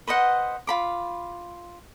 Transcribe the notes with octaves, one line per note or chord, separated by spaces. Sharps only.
B4 C5 D#5 F#5
F4 B5 D6